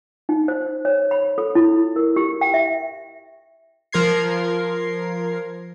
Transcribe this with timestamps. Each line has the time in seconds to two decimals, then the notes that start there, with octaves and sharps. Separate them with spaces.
0.29 D#4
0.48 C5
0.85 C#5
1.11 B5
1.38 A4
1.55 E4
1.96 A#4
2.16 G4
2.41 G5
2.54 E5
3.92 F3 A#4 C6 G#6 C7